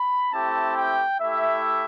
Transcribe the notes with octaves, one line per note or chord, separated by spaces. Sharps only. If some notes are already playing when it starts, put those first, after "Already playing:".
Already playing: B5
A3 C4 E4 G4 A5
G5
A3 E4 G4 E5